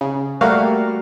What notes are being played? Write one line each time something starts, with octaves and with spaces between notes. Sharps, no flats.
C#3
G3 A3 A#3 F#4 F5